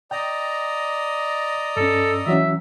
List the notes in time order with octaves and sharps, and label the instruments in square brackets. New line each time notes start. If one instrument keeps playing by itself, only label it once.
[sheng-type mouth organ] D5 D#5 A#5 [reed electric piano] G5
[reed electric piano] G2 C#4 [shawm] A4
[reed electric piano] E3 F#3 C#4 [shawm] E5